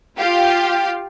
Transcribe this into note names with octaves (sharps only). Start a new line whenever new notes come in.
F4 G4 F5